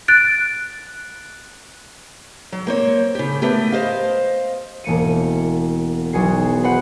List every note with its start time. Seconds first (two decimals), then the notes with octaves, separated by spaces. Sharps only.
0.08 F#6 A6 D7
2.52 F#3
2.67 A#3 C5 C#5
3.15 C#3 G4
3.42 A3 B3 G4 A#4
3.72 C5 D#5 F5
4.84 E1 A#3 C#7 D#7
6.13 B1 F#4 G#4 C7
6.64 B4 C5 F#5